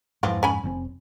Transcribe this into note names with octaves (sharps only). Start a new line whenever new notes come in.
F2 G#2 E3 F3 C4
C#4 G#5 B5
F1 A#2 C4